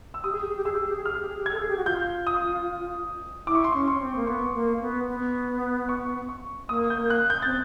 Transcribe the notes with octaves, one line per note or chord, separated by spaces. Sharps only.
E6
G4 D#6
G#4
G4
G#4
G4
G#4 E6
G4
G#4
G4
G#4
G4 F6
G#4
G4
G#4
G4
G#6
A4
G#4
G4
F#4
F4 G6
D#6
E4 D6
C#6
C6
C#4 C#6
C6
C#4
C4
A#3
B3 C#6
A#3
B3
B3
C#6
C#6
A#3 D#6
G6
A#3
F#6
G6
A6
C4